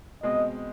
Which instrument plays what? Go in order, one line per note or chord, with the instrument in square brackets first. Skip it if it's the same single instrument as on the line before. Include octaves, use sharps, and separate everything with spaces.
[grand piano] B2 G#3 C4 [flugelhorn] D#5